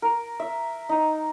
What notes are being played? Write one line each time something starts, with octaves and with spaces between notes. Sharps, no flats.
A#4
E5
D#4